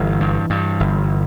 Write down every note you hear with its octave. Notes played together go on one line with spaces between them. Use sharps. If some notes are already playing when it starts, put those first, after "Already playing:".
Already playing: G1 E3
G2
G2
G1